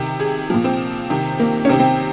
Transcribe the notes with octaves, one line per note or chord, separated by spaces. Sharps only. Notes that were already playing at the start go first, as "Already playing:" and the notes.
Already playing: C3 D#3
G#4
A#2 F3
C4
C3 D#3
A#3
C#4
C3 D#3 C4
C4